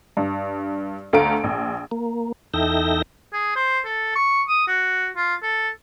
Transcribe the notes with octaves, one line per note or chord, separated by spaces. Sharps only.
G2
D2 A3 F5 A#5 D7
A#1
A#3
E2 D#4 A4 E5 G5 A#6
G#4
C5
A4
C#6
D#6
F#4
F4
A4